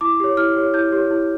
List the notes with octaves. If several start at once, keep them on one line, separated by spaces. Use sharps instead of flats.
E4 D6
G4 C#5
E4 F6
G4 C#5
E4 G6
G4 C#5
E4